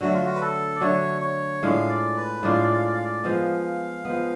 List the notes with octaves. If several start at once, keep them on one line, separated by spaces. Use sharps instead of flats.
D3 F#3 A3 F#4
F4
F#4
B4
A4
D5
D3 F#3 A3 C#5
C#5
A2 G#3 D4 F4 F5
D5
B4
A2 G#3 D4 F4 D5
F5
D5
F5
D5
F5
D5
F3 G#3 B3 F5
F3 G#3 B3